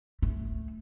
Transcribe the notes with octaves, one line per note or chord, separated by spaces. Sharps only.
A3